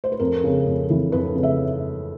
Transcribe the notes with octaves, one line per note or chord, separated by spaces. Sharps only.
C5
B4
F2 A#4
C#3
F2
E3
F2 B4
C#3
E5